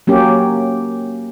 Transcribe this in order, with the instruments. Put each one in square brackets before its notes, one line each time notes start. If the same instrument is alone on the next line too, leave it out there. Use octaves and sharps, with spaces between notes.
[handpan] F#3 A#3 C#4 G4